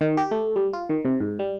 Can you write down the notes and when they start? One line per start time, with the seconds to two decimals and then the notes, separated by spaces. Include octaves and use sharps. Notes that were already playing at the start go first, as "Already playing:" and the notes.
0.01 D#3
0.17 G4
0.31 A3
0.56 G3
0.73 F4
0.89 D#3
1.05 C3
1.20 G#2
1.39 G3